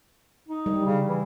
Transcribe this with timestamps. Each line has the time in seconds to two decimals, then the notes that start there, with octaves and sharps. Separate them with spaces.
0.48 D#4
0.66 G3
0.85 C#3
1.07 E3